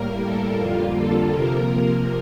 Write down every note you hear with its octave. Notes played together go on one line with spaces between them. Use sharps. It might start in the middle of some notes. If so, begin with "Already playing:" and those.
Already playing: A2 G3 A#3 A#4
A4
F2 D3 G3 A#3 F4
A4
C3 F3 A#3 A#4